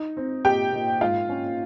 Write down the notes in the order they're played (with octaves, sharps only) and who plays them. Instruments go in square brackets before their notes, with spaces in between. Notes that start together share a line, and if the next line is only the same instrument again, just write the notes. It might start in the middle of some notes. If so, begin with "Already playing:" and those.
Already playing: [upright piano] D#4
C4
A#2 G4 G5
A#2
G#2 F4 F5
C#4